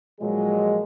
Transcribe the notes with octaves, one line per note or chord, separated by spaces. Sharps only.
A#2 F3 F#3 G#3